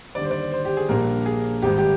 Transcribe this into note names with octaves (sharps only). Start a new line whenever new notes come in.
D#2 D3 G3 D5
C5
D5
C5
G4
G#4
A#1 A#2 G3 A#3 D4 A#4
G#4
G#1 G#2 G3 G4
G4